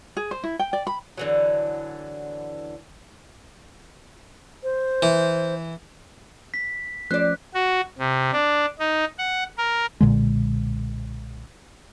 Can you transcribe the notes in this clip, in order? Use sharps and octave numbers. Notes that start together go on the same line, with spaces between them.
G#4
C5
E4
G5
D5
B5
D3 E3 F#3
C5
E3
B6
F3 A3 C#4 C5 D5 F#6
F#4
C3
D4
D#4
F#5
A#4
B1 A#2 D3 G#3